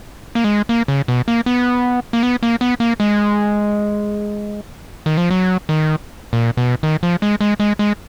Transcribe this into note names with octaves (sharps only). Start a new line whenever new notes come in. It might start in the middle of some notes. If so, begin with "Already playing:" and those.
A#3
G#3
A#3
C#3
B2
A#3
B3
A#3
B3
A#3
B3
A#3
G#3
D#3
F3
F#3
D#3
A#2
B2
D#3
F3
G#3
G#3
G#3
G#3